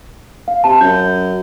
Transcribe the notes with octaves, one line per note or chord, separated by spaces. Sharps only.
F5
C3 A5
F#2 G6